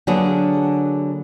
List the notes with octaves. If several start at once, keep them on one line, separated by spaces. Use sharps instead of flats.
D3 F#3 A#3 B3 D4 G#4